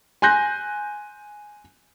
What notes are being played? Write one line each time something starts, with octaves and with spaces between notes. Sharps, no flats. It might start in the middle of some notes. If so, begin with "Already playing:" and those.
G#5 C6 F#6 G6 A#6